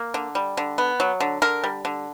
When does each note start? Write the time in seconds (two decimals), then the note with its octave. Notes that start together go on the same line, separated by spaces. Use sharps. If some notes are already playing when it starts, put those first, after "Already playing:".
Already playing: A#3
0.14 D3
0.35 G3
0.57 D3
0.78 B3
1.00 F#3
1.20 D3
1.42 D3 A#4
1.64 G3
1.85 D3